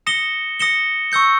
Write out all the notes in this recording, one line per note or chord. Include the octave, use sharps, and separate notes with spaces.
D#6 A#6 C#7 E7 G7
D#6 A#6 C#7 E7 G7
C#6 E6 G6 C#7